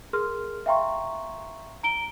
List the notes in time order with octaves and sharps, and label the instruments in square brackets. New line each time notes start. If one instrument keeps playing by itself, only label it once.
[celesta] G#4 A#4 C6 F6
E5 F5 G5 A#5 C6 C#6
A#5 D7 G7